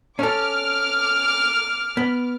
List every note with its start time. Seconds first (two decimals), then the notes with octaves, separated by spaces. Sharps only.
0.19 C#4 A4 D6 F6
1.97 B3